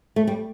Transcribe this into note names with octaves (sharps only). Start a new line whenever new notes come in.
A3
G3